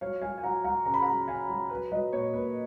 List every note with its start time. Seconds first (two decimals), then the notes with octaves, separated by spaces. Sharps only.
0.01 F#3 C#5 F5
0.22 F#3 F5 G#5
0.38 G#5
0.43 F#3 F#5 A#5
0.64 F#3 F#5 A#5
0.85 C#3 A#5
0.94 B5
1.02 F#3 F#5 A#5
1.28 C#3 F5 G#5
1.49 F#3
1.70 F#3 B4
1.92 F#3 B4 D#5
2.13 A#2 C#5
2.33 A#2 B4